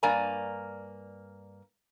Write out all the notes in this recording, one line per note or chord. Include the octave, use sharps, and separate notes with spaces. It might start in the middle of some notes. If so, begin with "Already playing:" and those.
G2 A#3 D5 G#5 A#5